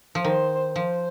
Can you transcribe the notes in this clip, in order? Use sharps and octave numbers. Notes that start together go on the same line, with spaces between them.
F3
D#3 C5
F3 C5